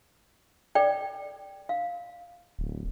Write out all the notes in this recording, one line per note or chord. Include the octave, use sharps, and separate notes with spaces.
A4 D5 G5
F5
D1